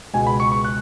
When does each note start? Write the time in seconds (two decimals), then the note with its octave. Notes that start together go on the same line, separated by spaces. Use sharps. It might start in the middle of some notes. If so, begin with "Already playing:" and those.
0.13 C#2 B2 G#3 G#5
0.27 B5
0.40 C#6
0.52 C#6
0.65 F#6